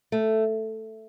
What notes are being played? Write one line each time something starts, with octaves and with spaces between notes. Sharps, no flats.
A3